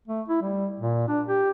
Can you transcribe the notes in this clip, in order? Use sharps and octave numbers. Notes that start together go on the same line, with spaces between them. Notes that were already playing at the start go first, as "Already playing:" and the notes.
A3
E4
G3
A#2
D4
G4